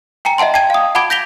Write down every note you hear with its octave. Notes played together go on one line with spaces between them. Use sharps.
G5 G#5 A#5 C#7
D#5 E5 F#5 A5 C6
G5 A5 G#6 D#7
F5 D#6
F#5 A5 B5 D6 G#6 D7
G6 A#6 B6 F7 G7